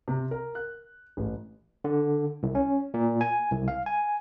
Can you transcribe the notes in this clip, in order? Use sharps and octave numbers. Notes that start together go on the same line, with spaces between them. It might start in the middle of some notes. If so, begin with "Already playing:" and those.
C3
A#4
F#6
A1
D3
C2
C#4
A#2
G#5
C2
F5
G#5